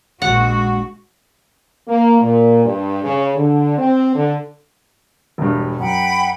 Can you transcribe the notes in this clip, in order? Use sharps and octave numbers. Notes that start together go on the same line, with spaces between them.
A#1 G#3 F#4 F#5
A#3
A#2
G2
C#3
D3
C4
D3
E1 G2
F#2 F#5 G5 B5